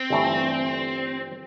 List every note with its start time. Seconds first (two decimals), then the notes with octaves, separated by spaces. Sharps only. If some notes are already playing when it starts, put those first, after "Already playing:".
Already playing: C4
0.10 G1 G2 E3 A3